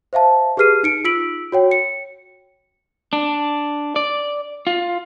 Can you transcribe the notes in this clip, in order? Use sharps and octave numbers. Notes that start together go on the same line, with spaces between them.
C5 E5 F5 A5
G4 G#4 B4 F6 C7 D#7
D#4 C#7 D7
F4 E6 B6 D7 F#7
F#4 C#5 G5
C#7
D4
D5
F4